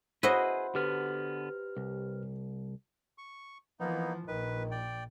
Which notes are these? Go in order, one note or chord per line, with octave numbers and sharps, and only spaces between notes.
E4 F#4 G#4 B4 C5 D#5
D3 B3 G4 B4 F6
C2
C#6
E3 F3 A#3 B3 D#4
A#1 D#3 B4
D5 G5